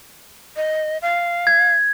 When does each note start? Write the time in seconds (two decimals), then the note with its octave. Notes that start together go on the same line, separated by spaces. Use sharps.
0.56 D#5
1.02 F5
1.47 G#6